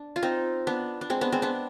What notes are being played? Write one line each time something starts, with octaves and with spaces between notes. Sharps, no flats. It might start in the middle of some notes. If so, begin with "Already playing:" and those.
Already playing: D4
F4
C4 D#4
B3 D4
D4
G#3 C4
B3 D4
G#3 C4
B3 D4